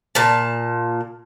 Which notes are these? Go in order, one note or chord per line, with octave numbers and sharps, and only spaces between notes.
A#2 A5